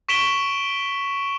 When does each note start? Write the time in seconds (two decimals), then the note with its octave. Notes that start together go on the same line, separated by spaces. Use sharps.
0.09 C#6 B6 D7 E7 F#7 G7